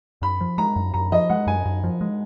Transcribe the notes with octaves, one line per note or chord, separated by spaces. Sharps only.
F#2 B5
F3
G#3 A#5
F#2
F#2 A#5
F3 D#5
G#3 F#5
F#2 G#5
F#2
F3
G#3